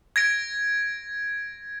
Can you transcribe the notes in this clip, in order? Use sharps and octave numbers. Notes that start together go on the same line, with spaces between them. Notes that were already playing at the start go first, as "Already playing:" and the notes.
G#6 A#6 D7